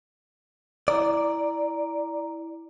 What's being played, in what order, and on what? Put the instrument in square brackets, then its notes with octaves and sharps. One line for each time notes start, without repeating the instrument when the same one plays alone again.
[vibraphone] E4 A#5 [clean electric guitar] D5